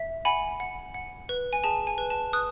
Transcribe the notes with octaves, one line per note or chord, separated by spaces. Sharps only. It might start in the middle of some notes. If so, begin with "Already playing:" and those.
Already playing: E5
F#5 G#5 B5
F#5
F#5
B4
G#5
G#4 A5
G#5
B4
A5
B4 D#6 F#6